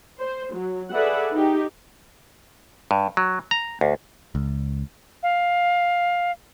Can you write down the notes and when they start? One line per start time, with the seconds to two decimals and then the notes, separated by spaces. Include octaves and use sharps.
0.20 C5
0.54 F#3
0.92 G#4 A4 B4 D5 E5 F#5
1.33 D#4 G4
2.91 G2
3.17 F#3
3.51 A#5
3.81 D2
4.35 C#2
5.23 F5